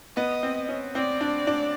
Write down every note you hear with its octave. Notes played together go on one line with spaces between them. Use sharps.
B3 D#5
C4
C#4
C4 D5
D4
D4